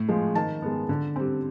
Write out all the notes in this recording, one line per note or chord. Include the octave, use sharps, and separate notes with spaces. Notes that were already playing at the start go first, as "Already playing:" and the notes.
Already playing: A2
F3 G#3
D#3 A5
G#3 B3
D3
G3 C4